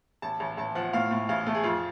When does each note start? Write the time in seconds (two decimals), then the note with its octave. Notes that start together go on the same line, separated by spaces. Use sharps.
0.22 A1 A5
0.40 A1
0.57 A1 A5
0.75 F3 F#5
0.93 A2 F5
1.11 A2
1.29 A1 F5
1.47 A3 A4
1.55 G#4
1.63 F2 F4